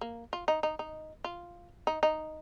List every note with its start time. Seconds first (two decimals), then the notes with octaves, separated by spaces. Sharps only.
0.01 A#3
0.33 F4
0.48 D#4
0.63 D#4
0.79 D#4
1.24 F4
1.87 D#4
2.03 D#4